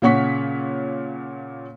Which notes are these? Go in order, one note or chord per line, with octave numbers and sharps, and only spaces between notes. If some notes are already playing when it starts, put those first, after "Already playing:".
A#2 C#3 C#5 F#5 C#6 B6